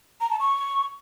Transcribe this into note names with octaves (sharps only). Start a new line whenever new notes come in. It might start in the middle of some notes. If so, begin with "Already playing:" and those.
A#5
A5
C#6